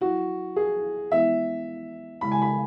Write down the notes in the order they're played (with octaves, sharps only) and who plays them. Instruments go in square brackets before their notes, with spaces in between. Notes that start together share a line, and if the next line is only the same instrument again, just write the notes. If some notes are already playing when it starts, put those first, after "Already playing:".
[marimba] F#3 E4 [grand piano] F#4
[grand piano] G#4
[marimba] E3 G#3 B3 E4 [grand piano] E5
[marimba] C#3 G#3 E4 [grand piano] B5
[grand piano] G#5
B5